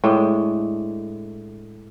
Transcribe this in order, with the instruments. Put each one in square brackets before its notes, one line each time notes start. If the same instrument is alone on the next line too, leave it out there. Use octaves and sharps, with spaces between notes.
[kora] A2 G#3 D4